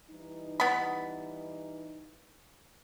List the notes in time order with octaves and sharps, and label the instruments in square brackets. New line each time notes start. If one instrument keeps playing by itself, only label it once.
[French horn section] E3 G3 D#4
[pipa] B3 B5